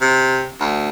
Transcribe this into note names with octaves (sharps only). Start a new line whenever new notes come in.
C3
D2